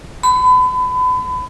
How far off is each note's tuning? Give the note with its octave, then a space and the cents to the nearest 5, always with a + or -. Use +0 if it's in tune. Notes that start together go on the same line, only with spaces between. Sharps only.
B5 +35